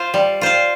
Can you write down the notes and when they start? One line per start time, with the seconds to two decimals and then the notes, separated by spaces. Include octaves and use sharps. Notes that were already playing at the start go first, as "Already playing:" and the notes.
Already playing: F4 C5 F5
0.14 G3
0.41 F4 C5 F5